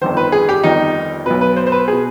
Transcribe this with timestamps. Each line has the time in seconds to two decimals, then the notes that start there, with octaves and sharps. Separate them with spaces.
0.01 G1 F2 D#3 C5
0.17 B4
0.32 G#4
0.49 G4
0.63 G1 F2 D#3 D#4
1.26 B1 B2 B4
1.41 B4
1.56 C5
1.67 C5
1.72 B4
1.88 B2 G#4